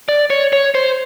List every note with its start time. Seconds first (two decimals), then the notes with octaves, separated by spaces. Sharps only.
0.09 D5
0.30 C#5
0.53 C#5
0.75 C5